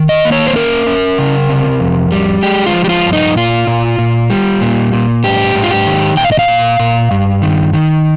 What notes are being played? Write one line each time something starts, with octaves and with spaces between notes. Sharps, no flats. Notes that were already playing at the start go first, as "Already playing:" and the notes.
Already playing: D#3
D#5
A#3
C#5
C5
C#4 A#4
C#4
C#3
C3
F2
G3
G#3 G4
F4
F3
G4
F4
G2
D#4
A#2 F4
A#2
A#2
G3
A#2
A#2
G#2 G4
G#2
F4
G4
D#3
A#2 G5
F5
D#5
F5
A#2
A#2
G2
D#3
D#3